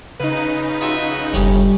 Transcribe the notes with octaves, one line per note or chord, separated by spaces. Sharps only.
C#3 D#4 B4
F4 F#4 E5
F#1 F#2 A2 G3 C#4